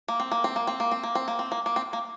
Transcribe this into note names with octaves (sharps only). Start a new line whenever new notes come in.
A#3
C4
A#3
C4
A#3
C4
A#3
C4
A#3
C4
A#3
C4
A#3
A#3
C4
A#3